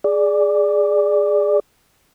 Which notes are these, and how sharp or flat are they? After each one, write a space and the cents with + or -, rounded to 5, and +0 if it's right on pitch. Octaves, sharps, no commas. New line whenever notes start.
G#4 +0 D5 +0